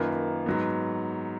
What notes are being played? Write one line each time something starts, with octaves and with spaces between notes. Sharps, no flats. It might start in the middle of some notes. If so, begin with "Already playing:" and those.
Already playing: F#2 D#3 A#3 F4 B4
G#2 F#3 B3